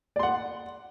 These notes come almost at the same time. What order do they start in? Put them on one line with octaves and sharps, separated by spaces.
D5 C6 F#5